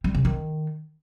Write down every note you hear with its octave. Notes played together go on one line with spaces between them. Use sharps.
G3
C#3
D#3